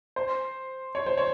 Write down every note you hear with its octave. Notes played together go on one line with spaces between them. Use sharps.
C5
C#5
C5
C#5